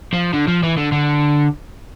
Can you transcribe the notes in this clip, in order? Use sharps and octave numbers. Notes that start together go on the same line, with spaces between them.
F3
D3
F3
E3
D3
D3